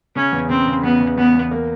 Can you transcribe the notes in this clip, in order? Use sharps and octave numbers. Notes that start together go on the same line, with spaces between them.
C#3 C#4
E2
C#3 C4
C#3
E2 B3
E2
E2 B3
E2
A#3